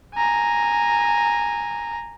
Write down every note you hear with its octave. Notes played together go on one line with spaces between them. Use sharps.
G#5 A#5